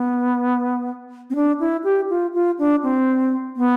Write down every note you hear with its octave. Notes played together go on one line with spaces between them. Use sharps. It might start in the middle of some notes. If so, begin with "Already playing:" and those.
Already playing: B3
C4
D4
E4
G4
F4
F4
D4
C4
B3